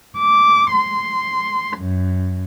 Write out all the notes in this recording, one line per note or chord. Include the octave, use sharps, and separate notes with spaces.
D6
C6
F#2